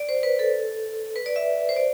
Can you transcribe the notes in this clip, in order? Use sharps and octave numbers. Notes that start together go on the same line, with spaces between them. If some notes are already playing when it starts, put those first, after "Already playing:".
Already playing: D5
C5
B4
A4
B4
D5
E5
C5
D5